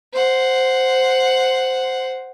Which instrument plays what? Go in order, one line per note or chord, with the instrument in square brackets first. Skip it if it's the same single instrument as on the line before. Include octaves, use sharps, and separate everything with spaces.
[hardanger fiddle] C5 F#5